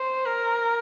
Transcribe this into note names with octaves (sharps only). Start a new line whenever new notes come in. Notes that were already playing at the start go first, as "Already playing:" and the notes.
Already playing: C5
A#4